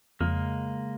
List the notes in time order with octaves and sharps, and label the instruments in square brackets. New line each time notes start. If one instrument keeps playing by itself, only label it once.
[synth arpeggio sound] F2 [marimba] C#3 [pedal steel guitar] G#3 A#3